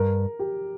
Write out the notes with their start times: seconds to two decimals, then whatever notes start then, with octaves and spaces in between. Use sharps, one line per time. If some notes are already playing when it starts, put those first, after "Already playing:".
Already playing: G2 A#4
0.39 G4